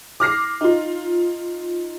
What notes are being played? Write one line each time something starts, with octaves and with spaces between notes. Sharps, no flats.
D6 F6 A#6 C7
D#4 F4